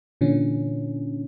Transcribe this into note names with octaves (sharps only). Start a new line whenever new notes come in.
A#2 D3 E3 C#4